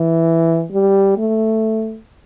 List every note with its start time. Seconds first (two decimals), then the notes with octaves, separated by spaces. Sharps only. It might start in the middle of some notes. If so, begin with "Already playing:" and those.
Already playing: E3
0.73 G3
1.18 A3